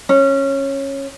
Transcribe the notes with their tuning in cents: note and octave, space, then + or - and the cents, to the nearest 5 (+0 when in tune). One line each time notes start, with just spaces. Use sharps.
C#4 -15